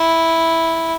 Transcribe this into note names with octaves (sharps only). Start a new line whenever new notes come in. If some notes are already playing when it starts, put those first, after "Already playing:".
Already playing: E4